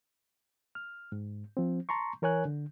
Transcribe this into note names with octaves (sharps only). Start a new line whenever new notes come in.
F6
G#2
F3 C4
A5 A#5 C6 C#6
E3 A#4 C#5 G#5 F#6
D3